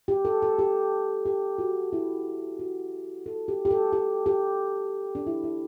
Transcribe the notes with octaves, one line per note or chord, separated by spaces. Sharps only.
G4
A4
A4
G4
G4
F#4
E4
F#4
A4
G4
G4
A4
G4
G4
D4
E4
E4